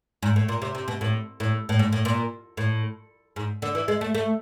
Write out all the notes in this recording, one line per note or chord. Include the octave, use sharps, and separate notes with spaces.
G#2
A2
A#2
C3
C3
B2
A2
A2
A2
G#2
A2
A#2
A2
G#2
D3
E3
G#3
A3
A3